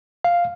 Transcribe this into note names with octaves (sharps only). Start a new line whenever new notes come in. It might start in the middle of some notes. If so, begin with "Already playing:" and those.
F5